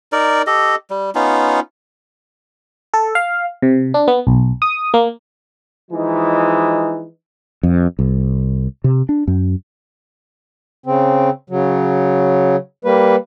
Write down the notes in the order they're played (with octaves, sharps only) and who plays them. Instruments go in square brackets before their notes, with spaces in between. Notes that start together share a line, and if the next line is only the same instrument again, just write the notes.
[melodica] D#4 A#4 D5
G4 A4 D#5
G3
B3 C#4 D#4 F4
[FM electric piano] A4
F5
C3
D4
B3
B1
D#6
A#3
[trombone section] E3 F3 G#3 D#4
[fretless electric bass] F2
C2
C3
D4
F#2
[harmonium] C#3 C4
C#3 F#3
G3 A#3 B4